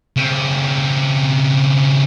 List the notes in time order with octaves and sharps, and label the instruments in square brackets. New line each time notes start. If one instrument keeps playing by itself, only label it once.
[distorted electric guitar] C#3 C4